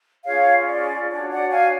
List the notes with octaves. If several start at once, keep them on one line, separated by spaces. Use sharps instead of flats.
C#4 F4 G#4 C#5 F5
D5
D4 F#4 C#5 D5
D5 F#5
F5 G#5